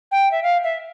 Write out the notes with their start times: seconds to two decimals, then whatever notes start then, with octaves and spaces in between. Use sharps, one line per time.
0.12 G5
0.31 E5
0.43 F5
0.64 E5